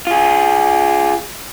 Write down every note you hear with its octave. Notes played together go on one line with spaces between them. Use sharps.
F4 G#4